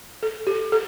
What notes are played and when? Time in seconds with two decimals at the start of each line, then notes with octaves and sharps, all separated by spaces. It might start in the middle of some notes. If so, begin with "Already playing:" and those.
0.23 A4
0.47 G4
0.72 A4